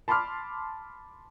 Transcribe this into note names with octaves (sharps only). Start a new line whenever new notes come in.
A5 B5 C6 D6 F6